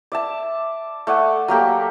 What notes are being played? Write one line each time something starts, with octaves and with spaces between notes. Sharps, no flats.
D5 E5 A5
A3 D5 F#5 G#5
F#3 A#3 G4 A4